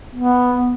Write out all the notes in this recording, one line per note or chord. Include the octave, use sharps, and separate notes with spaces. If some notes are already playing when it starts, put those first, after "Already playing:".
B3